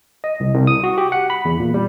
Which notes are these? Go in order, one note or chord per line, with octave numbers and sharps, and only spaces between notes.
D#5
C2
C2
D#6
F#4
G4
F#5
B5
E2
A#2
G3